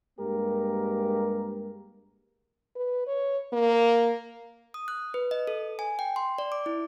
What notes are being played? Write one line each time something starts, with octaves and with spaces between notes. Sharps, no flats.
G2 G#3 A#3 G4 A#4
B4
C#5
A#3
D#6
F#6
B4
D#5
A4
G#5
G5
C6
D5
D6
E4